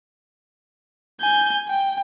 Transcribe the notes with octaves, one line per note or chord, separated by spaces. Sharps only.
G#5 G6
G5